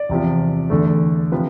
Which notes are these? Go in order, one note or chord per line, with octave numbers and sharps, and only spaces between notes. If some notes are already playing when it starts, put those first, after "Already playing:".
Already playing: D5
E2 C3 F3
E2 D3 A3
C3 F3 B4